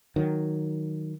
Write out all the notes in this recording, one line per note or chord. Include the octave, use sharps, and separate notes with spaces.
D#3 F#3